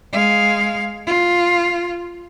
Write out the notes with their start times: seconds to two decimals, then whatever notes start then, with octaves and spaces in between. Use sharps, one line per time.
0.12 G#3 F5
1.07 F4